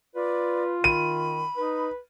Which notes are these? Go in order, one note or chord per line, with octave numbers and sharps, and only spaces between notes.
F4 B4 D5
D#3 B5 D#7
D#4 B4